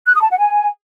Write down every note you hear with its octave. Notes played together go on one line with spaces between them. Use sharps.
F#6
D#6
A5
F#5
G#5